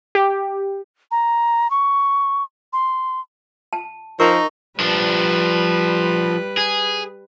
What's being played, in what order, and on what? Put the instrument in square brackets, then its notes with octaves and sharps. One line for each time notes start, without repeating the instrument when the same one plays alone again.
[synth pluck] G4
[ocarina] A#5
C#6
C6
[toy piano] A5
[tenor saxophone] F3 [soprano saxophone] D#4 [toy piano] A#4 [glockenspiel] C#6
[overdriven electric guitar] F3 D4 [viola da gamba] G3 B4
[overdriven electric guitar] G#4